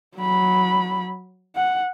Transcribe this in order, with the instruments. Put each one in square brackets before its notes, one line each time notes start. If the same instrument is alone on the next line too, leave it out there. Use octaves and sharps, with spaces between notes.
[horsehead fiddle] F#3 B5
F#5